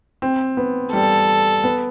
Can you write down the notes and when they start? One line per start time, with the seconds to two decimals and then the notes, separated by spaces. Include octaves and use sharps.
0.22 C4
0.57 B3
0.93 G3 A4
1.64 B3